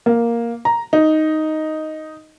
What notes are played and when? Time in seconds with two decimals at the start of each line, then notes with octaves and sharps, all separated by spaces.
0.06 A#3
0.65 A#5
0.93 D#4